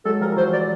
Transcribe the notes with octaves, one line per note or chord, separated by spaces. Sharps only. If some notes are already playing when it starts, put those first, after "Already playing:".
F#3 G#3 A4
F3 G3 A#4
E3 F#3 C5
D5